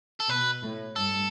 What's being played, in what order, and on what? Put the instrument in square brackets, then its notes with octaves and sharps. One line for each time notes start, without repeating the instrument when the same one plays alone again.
[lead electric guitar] A4
[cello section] B2 [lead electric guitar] B4
[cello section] A2
[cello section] G2 [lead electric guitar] A4